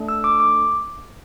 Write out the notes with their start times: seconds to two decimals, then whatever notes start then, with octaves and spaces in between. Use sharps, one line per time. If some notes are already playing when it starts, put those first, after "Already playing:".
Already playing: A3 D4 A4
0.08 E6
0.24 D6
0.40 D6